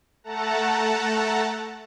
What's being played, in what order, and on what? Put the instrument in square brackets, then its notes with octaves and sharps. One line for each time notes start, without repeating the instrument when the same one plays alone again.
[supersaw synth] A3 A4 F#5 A5 A#5